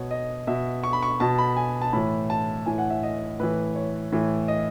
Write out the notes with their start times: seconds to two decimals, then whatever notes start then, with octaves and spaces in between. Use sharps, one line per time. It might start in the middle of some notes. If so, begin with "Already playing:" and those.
Already playing: B2 C#5
0.11 D#5
0.47 B2 E5
0.84 C#6
0.93 B5
1.03 C#6
1.20 B2 A5
1.38 B5
1.57 G#5
1.82 A5
1.93 A2 E3 B5
2.30 A5
2.66 A2 E3 G#5
2.78 F#5
2.90 E5
3.03 D#5
3.40 A2 E3 B4
3.75 C#5
4.12 A2 E3
4.48 D#5